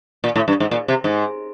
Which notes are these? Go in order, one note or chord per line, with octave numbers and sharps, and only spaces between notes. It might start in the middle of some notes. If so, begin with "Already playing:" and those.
A#2
A2
G2
G#2
A#2
C3
G#2